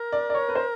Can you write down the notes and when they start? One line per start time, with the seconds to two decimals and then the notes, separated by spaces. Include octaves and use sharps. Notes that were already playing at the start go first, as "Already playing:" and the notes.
Already playing: A#4
0.12 D5
0.30 D5
0.35 C#5
0.49 B4
0.55 C5